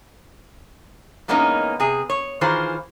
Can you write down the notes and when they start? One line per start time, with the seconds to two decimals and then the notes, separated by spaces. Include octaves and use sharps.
1.28 E3 G#3 A#3 B3 C#4 D#4
1.80 C3 G#4
2.10 C#5
2.41 D#3 E3 F4 G#4 C5